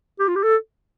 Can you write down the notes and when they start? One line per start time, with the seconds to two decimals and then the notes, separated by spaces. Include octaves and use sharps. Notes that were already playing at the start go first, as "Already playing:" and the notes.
0.19 G4
0.28 F4
0.36 G4
0.43 A4